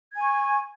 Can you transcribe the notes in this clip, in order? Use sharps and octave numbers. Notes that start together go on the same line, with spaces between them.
G#5 C#6 G#6